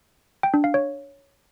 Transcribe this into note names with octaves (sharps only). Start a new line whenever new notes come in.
G5
D4
F5
C#5